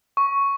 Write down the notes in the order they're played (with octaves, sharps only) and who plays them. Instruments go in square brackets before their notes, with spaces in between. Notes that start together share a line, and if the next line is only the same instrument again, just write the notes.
[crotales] C#6